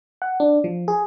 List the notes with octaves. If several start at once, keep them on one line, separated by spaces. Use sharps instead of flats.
F#5
D4
F3
G#4